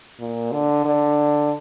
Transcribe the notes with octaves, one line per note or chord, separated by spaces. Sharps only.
A#2
D3
D3